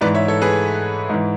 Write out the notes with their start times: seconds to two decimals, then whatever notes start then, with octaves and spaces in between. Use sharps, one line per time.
0.01 G#2 E3 B4 D5
0.15 C#5 E5
0.28 A4 C#5
0.41 G#4 B4
1.09 G#2 E3